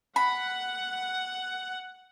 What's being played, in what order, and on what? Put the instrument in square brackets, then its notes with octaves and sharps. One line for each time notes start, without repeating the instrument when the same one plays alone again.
[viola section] F#5 [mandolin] B5